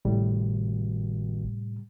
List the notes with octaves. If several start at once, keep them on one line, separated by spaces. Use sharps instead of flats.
G#1 A2 C3 G3